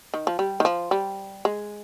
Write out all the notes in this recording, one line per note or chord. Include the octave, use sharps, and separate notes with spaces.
D#3
F3
G3
D#3
F3
G3
G#3